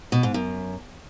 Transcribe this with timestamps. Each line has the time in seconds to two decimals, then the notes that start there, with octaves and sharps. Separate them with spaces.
0.12 B2
0.23 G#2
0.34 F#2